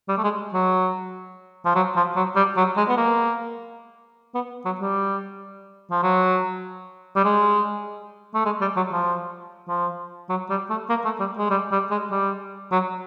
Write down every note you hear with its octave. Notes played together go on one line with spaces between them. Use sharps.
G3
A3
G#3
F#3
F3
F#3
F3
F#3
G3
F#3
G#3
B3
A#3
B3
F#3
G3
F3
F#3
G3
G#3
A3
G#3
G3
F#3
F3
F3
F#3
G3
A3
A#3
A3
G3
G#3
G3
G3
G#3
G3
F#3